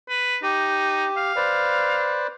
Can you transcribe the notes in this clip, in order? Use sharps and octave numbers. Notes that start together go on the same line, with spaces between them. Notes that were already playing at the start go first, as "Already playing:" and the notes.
B4
D#4 G4
F5
B4 C5 D5